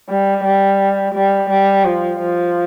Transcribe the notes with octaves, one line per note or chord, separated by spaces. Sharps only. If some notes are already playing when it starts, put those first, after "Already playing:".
G3
G3
G3
G3
F3
F3